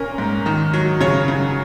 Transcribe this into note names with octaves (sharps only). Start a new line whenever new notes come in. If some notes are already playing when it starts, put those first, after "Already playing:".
Already playing: A#2 C#4 A#4
G#2
D#3
F#3
C#3 C#5
C#3